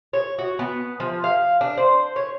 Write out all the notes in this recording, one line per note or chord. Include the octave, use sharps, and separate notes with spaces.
C#5
F#4
B3
F3
F5
D4
C5
C#5